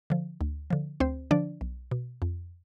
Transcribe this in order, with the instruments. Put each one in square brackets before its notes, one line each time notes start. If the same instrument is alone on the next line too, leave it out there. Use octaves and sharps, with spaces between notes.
[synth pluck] D3 F3
D2
D3 F3
D2 C4 C5
D3 F3 D4 D5
B1
B2
F2